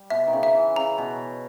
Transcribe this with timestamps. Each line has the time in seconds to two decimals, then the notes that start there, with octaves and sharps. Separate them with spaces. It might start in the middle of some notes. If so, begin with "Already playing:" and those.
Already playing: G3
0.10 B2 E5
0.27 D#3
0.33 C#3
0.43 E5
0.54 E3
0.76 C#3 A#5
0.98 B2